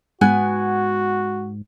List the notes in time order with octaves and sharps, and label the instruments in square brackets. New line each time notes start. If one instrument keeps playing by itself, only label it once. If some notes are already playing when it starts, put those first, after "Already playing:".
[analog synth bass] G#2 [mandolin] B3 G#5 F#6 [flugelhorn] F#4